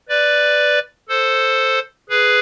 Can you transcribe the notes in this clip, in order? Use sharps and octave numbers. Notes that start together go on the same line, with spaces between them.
B4 D5
A4 C5
G#4 B4